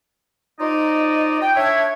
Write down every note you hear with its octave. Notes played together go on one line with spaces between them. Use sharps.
D#4 F4 C5 D5 D#5
G5
D4 C#5 E5